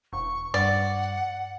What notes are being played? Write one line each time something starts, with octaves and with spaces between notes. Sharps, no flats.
E1 C#6
G2 D5 F#5